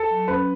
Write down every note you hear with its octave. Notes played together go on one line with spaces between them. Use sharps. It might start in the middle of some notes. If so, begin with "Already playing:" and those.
Already playing: A4
F#3
C#4 B4